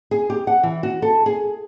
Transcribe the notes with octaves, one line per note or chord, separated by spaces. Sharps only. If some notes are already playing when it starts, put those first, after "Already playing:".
G#4
G4
F#5
E3
F#4
A4
G#4